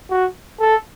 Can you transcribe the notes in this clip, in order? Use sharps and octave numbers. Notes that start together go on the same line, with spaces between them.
F#4
A4